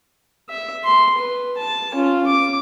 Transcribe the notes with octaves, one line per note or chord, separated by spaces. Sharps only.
E5
C6
B4
A5
C#4 F4
D6